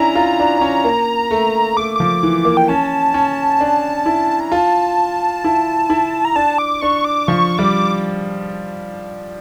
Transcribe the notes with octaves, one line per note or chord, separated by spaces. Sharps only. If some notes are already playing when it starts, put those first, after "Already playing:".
Already playing: C#4 D4 E4 A#5
F4
D4
D4
C#4
A#3
A3
A3 D6
F3 D6
E3
A#3
G5
C#4 A5
C#4
D4
E4
A#5
F4 A5
E4
E4
A#5
D4 A5
D6
D4 C#6
D6
F3 C#6
G3 D6